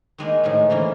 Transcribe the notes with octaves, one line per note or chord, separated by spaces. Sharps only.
D#3 G#3 A#3 D#4
A2 D#3 F3 G#3
D3 E3 A#3 C#4